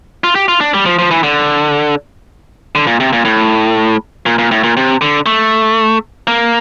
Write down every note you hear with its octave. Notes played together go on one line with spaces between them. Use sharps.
F4
G4
F4
D4
G3
F3
F3
E3
D3
D3
A#2
C3
A#2
A2
A#2
A#2
A2
A#2
C3
D3
A3
A#3